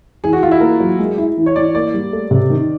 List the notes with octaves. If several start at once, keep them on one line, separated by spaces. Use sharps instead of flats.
E3 G#4
F#4
E3 F4
E4
A#3 A#4
F#3
G#3
E4
E3
C#5
E3 D5
A#3 D5
G3
A3
C3
D#3